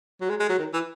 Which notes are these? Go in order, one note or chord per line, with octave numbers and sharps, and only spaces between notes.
F#3
G#3
G#3
F#3
D#3
E3